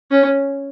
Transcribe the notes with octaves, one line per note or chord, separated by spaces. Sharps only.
C#4